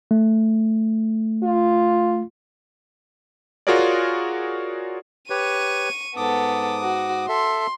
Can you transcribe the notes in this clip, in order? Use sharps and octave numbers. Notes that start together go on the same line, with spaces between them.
A3
F4
F4 F#4 G#4 A#4 C#5 D5
G4 B4 C#5 C#6 D#7
G#2 B3 A4 D6 D#6
F#4
A4 E5 C6